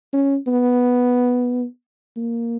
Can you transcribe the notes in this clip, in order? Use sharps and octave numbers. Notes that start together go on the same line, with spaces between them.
C#4
B3
A#3